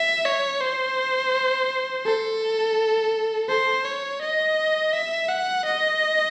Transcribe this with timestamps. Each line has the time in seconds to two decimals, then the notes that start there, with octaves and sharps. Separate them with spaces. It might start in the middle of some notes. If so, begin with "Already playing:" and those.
Already playing: E5
0.25 C#5
0.61 C5
2.05 A4
3.49 C5
3.85 C#5
4.22 D#5
4.93 E5
5.29 F#5
5.65 D#5